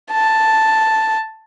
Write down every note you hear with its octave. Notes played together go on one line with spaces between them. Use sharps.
A5